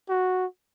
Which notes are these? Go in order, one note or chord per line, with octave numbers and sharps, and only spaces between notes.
F#4